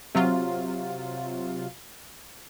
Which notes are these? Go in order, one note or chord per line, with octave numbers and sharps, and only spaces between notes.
C3 F#3 F4